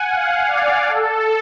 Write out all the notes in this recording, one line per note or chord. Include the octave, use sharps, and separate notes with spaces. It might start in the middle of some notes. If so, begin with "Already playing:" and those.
Already playing: F#5 G#5
F5
D5
A4